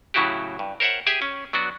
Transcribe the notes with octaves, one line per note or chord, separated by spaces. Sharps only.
A2 C#3 F#3 E4 F#4 G4
G2
A#4 C5 C#5 E5 F#5
G4 G#4 E5 G#5
C#4
F#3 B3 D4 F#4